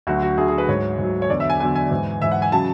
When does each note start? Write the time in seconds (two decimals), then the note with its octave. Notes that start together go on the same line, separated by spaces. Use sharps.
0.07 D2 D3 F#3 F#4
0.22 F#4
0.38 D2 D3 F#3 G#4
0.48 G#4
0.58 B4
0.68 G#2 F#3 C#5
0.98 G#2 F#3
1.22 C#5
1.30 E2 D3 F#3 D5
1.40 E5
1.50 G#5
1.60 E2 D3 F#3 G#5
1.75 G#5
1.91 G#2 E3
2.21 G#2 E3 E5
2.31 F#5
2.42 G#5
2.52 C#3 F#3 A5